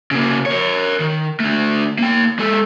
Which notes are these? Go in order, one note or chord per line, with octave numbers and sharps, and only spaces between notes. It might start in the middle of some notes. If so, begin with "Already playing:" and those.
C#3 A#3
A#4 C#5
D#3
D3 A3
A#3 G5
G#3 A4